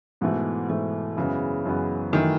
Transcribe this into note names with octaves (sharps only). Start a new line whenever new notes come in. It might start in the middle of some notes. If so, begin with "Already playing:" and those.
G#2 B2 E3 A3
G#2 E3 A3
F#2 C#3 E3 G#3 B3
F#2 E3 G#3 B3
F#2 D#3 E3 A3